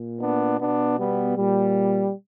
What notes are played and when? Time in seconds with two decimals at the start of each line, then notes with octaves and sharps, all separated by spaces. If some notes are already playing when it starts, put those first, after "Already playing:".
Already playing: A#2
0.20 B3 D4
0.59 B2 B3 D4
0.98 G3 B3
1.37 A#2 G3